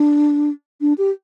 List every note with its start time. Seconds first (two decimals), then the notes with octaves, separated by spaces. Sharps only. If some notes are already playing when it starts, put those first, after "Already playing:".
Already playing: D4
0.81 D4
0.98 G4